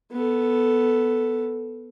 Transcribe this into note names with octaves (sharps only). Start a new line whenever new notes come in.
B3 A4